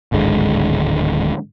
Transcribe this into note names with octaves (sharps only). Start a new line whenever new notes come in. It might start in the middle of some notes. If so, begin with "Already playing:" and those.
D1 G#1 D3 G#3